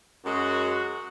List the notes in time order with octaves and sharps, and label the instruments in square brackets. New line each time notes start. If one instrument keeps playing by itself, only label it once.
[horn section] F#2 G#3 F#4